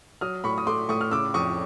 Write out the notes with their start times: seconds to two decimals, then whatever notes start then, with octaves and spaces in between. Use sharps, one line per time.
0.21 F#3 D#6 F6
0.44 A2 B5 C#6
0.58 D#6
0.67 A3 C6 D6
0.89 A2 C#6 D#6
1.01 F6
1.12 C#3 D6 E6
1.34 F2 C#6 D#6